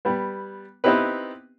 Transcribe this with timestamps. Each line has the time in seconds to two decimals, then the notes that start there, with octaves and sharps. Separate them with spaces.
0.05 G3 B3
0.84 B3 C4 D#4 E4 G4 B4